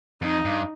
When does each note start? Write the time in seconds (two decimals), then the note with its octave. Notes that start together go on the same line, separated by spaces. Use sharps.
0.22 F2 D#4
0.45 G2